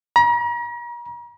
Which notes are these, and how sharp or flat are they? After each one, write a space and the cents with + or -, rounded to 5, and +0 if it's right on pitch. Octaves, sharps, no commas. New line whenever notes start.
A#5 +40